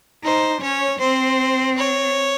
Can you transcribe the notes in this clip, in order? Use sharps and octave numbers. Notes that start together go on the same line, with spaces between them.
D#4 C5
C#4 C#5
C4 C5
C#5